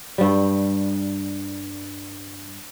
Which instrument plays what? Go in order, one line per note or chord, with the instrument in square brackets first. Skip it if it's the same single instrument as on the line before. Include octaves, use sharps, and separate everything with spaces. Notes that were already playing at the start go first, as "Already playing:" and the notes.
[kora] G2 G3